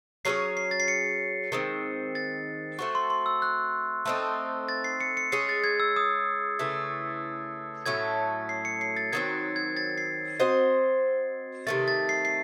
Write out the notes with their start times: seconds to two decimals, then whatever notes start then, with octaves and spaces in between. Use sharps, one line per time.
0.25 F#3 C#4 G#4 C#5 C7
0.57 C7
0.71 A6
0.80 C7
0.88 C#7
1.52 D#3 G#3 C4
2.15 A6
2.79 A3 C4 F#4 C#6
2.95 C6
3.10 C6
3.26 E6
3.42 F#6
4.06 A3 C4 D#4
4.69 A6
4.84 C7
5.00 C#7
5.17 C#7
5.32 G#3 C#4 G#4 C7
5.49 A6
5.64 G#6
5.80 E6
5.96 D#6
6.59 C#3 E3 A3
7.86 A2 F#3 A3 C#4 G#6
8.49 C7
8.65 C#7
8.81 C7
8.97 A6
9.12 D#3 F#3 C4 G#6
9.56 G#6
9.77 A6
9.98 C7
10.40 C4 F#4 C5 D#5
11.67 C3 D#3 A3 A6
11.88 A6
12.09 C7
12.25 C7